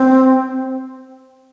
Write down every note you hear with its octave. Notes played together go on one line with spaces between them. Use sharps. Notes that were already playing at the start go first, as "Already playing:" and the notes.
Already playing: C4